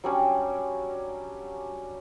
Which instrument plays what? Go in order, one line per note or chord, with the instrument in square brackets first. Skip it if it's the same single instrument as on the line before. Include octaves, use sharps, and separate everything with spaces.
[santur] F#3 G3 C#4 D4